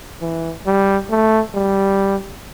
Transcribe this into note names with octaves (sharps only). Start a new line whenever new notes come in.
E3
G3
A3
G3